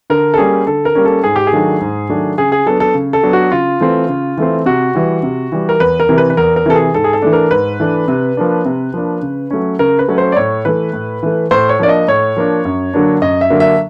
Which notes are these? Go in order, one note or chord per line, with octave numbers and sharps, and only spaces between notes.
D3 A#4
A4
G3 A#3 C#4 G#4
D3 A4
A#4
G3 A#3 C#4
A4
G#2 G#4
G4
G#4
D#3 F#3 A3 D4
G#2
D#3 F#3 A3 D4
C#3 G#4
G#4
F#3 B3 D4 A4
A4
C#3
A4
F#3 B3 D4
F#4
C#3 F4
E3 A3 C4
C#3
E3 A3 C4
C3 F#4
E3 G3
C3
E3 G3
A#4
E2 B4
A#4
C3 E3
B4
B4
E2 A#4
A#4
C3 E3 A4
G#4
G#2 A4
G#4
A4
E3 A3 D4
A#4
G#2 B4
E3 A3 D4
C3
F3 A#3 D4
C3
F3 A#3 D4
C#3
F#3 A3 C#4
C#3 A#4
B4
F#3 A3 C#4
C5
D5
A2 C#5
E3 A3 B4
A2
E3 A3
A2 C5
C#5
F3 A#3 D4 D5
D#5
A2 C#5
F3 A#3 D4
F#2
D3 F#3 A#3 D4
F#2 D#5
E5
D3 F#3 A#3 D4
E5